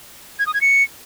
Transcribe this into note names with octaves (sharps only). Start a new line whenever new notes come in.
G#6
D#6
G#6
C#7